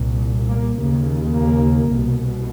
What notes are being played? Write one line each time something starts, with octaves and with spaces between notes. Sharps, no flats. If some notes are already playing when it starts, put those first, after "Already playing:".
Already playing: C2 A#2
A#3
D#2 C#3 A#3
A#3
C2 B2